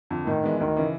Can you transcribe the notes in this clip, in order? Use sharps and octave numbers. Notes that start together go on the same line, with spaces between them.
F2 D3
A2 D#3
E3 G#3 B3 D4
D2 D#3
C#3 E3